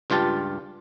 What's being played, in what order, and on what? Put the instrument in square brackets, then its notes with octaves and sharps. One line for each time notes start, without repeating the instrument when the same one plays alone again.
[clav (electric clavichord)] C#2 G2 F4 G4 A5